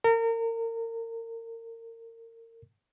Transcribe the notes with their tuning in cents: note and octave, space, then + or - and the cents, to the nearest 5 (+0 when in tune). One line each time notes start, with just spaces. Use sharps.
A#4 -30